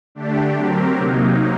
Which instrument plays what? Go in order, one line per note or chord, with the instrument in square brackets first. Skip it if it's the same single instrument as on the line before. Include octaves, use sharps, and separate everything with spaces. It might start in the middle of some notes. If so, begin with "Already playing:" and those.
[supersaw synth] D3 A3 D4 G4
F#3 C4 G4 A#4
C3 F#3 A#3 D#4